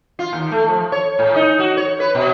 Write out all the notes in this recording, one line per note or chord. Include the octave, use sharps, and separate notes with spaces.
F4
D#2
A3
F3
C#5
A2
D#4
F#4
C#5
B4
B2